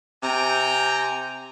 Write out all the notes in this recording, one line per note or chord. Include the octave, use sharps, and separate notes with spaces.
C3 G5 G#5 A#5